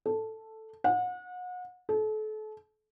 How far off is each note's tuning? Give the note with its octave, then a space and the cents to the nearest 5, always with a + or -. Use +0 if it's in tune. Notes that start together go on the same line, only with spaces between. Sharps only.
A4 +0
F#5 -35
A4 -35